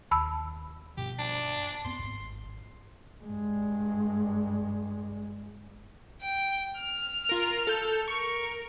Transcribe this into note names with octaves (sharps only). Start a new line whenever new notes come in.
D#2 A5 B5 E6
G2 B2 F3 G4
D4
G2 B3 C4 C6
G#1 F#2
G2 G#3
G5
F6
F4 A#4
A4 G6
A#4 C#6